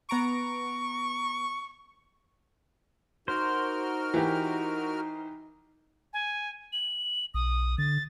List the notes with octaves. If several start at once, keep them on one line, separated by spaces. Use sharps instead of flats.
B3 A#5 C#6 D7
D#4 F#4 A#4 C5 F6
E3 G4
G#5
F#7
B1 D#6
D3 A6